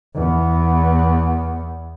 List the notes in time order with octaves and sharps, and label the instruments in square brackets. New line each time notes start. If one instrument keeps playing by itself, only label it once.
[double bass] E2 B3